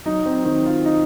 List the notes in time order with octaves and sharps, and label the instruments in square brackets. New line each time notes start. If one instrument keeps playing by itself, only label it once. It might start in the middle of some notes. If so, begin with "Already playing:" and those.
[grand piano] F#3 [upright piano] D#4
[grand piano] C4
[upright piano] D#3 [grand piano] C4
[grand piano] F4
[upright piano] D#4